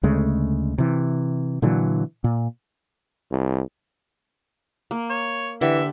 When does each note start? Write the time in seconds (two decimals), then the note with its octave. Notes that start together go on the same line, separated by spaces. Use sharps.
0.03 D2 C#3 G#3 A3
0.78 C3 E3
1.62 A#2 D3 E3 F#3
2.24 A#2
3.31 C2
4.91 A#3
5.10 C#5
5.61 D3 E3 G4 E5